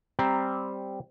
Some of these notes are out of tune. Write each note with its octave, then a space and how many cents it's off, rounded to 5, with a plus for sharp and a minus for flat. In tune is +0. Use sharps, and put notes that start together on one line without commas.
G3 +0 C4 +0 A#5 +0